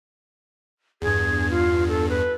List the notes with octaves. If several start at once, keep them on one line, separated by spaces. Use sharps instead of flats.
E2 G2 G#4
F4
A4
B4